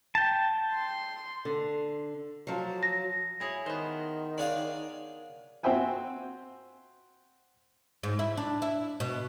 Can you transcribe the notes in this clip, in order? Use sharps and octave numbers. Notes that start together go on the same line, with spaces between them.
G5 A5
C6
D3
F3 F#3
A#6
E4 G#4 C#5
D#3 B3 C5
D4 G#4 C#5 D5 F5
C4 F#4 C5 E5 G5 G#5
G#2
E4
D4
E4
B2